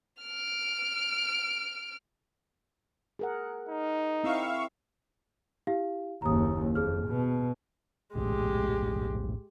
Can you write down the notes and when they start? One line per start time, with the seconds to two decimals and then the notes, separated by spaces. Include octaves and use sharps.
0.23 F6 D7
3.19 G#4 A#4 F#5
3.69 D#4
4.24 C4 E4 E5 F5 C#6
5.67 E4 G4 F5
6.22 F#1 D#2 A#5 D#6
6.75 F2 G#4 F6
7.07 B2
8.15 D1 A#1 A2 G#3 G4